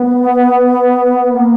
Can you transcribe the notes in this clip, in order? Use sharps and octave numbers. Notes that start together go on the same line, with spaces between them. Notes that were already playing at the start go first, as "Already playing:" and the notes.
Already playing: B3
A#3